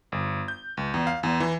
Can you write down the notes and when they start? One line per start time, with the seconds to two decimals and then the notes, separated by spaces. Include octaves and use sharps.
0.12 G1
0.48 G6
0.77 C#2
0.94 E2
1.07 F5
1.23 E2
1.40 E3